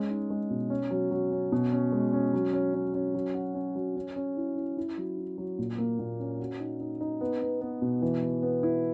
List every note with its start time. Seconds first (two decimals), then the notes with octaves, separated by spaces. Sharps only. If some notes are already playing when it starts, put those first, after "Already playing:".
Already playing: G#3 C#4
0.10 D#4
0.30 G#3
0.50 B2
0.70 C#4
0.91 F#3
1.11 F#3
1.31 C#4
1.52 B2
1.72 C#4
1.92 G#3
2.13 C#4
2.34 F#3
2.53 C#4
2.74 C#4
2.94 C#4
3.14 F#3
3.35 F#4
3.55 C#4
3.75 F#3
3.96 C#4
4.16 C#4
4.37 E4
4.57 E4
4.77 E4
4.97 F#3
5.18 E4
5.38 F#3
5.59 A#2
5.78 A#3
5.99 A#2
6.20 C#4
6.40 F#4
6.60 D#4
6.80 D#4
7.01 D#4
7.21 B3
7.42 B3
7.61 B3
7.82 B2
8.02 E3
8.22 E3
8.42 B3
8.63 E4